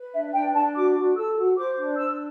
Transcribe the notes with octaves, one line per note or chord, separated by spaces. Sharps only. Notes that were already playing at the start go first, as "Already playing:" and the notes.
Already playing: B4
D4 E5
D4 G5
D4 A5
F#4 D6
F#4
A4 E6
F#4
C5 D6
D4
D4 E6